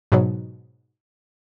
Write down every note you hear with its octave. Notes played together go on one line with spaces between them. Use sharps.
G#2 B2 F#3